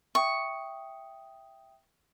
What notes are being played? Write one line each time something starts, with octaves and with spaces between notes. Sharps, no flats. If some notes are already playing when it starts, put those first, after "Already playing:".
E5 G5 C#6 D#6